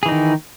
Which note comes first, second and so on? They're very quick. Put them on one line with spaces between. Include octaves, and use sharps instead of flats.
G#4 E3 D#4 D#3